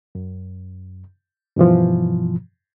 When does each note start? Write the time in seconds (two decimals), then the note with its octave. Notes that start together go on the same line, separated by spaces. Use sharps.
0.15 F#2
1.56 G2 B2 E3 F3